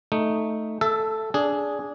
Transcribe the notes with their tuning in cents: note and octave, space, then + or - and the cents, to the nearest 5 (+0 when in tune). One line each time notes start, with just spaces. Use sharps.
A3 +0 D#4 +0
A4 +0 E5 +20
D4 -15 G#4 +0